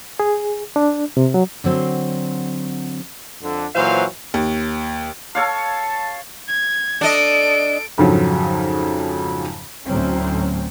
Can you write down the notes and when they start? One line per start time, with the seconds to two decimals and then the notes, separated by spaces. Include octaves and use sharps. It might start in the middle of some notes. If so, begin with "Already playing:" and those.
0.20 G#4
0.76 D4
1.17 C3
1.34 F#3
1.64 D3 F#3 C4
3.41 F2 D3
3.75 A#2 E3 F#3 C5 F5
4.34 D#2
5.35 A4 C#5 F5 A5
6.48 G#6
7.01 D4 A4 D#5 D7
7.98 F2 G#2 C#3 F3 F#3
9.85 D2 A2 F#3 C4 C#4